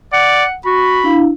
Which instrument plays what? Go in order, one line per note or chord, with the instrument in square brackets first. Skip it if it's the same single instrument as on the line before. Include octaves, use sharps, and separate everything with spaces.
[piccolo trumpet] D5 [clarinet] F#5
[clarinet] F#4 [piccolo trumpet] B5
[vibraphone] D4 E4 F5